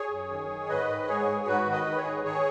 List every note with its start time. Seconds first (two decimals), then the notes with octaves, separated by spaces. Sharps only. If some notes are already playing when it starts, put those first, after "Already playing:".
Already playing: G#4 C#5
0.11 F#2
0.31 D#3
0.49 D#3
0.69 G#2 B4 D#5
0.88 D#3
1.07 G#2 G#4 C#5
1.28 G#2
1.46 G#2 F#4 B4
1.66 D#3
1.72 B4 D#5
1.85 D#3
1.97 G#4 C#5
2.04 G#2
2.24 D#3 G#4 C#5